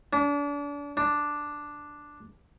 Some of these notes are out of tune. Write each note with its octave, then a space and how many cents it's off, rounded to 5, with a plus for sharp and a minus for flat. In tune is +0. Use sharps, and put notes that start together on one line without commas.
D4 -35
D4 +0